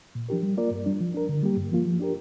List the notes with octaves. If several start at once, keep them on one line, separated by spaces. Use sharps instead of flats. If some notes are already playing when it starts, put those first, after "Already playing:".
A#2
F3 D4 G4 A#4
G3
A#3 F4 A#4 D5
G2
G3 D4
F3
D4 A#4
D3
G3 A#3 G4
G2
F3 A#3 F4
F3
D4 G4 A#4